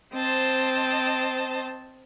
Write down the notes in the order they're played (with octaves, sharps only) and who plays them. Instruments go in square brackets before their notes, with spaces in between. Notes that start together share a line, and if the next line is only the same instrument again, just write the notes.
[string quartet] C4 C5 D#5 A5